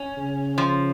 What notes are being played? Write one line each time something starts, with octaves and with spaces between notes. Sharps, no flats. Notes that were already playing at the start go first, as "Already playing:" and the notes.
Already playing: C#4
C#3
F3